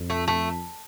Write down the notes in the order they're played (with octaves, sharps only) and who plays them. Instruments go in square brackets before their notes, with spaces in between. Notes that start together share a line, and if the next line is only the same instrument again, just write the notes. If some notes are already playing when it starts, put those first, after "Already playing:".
Already playing: [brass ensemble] F2
[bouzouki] A3
A3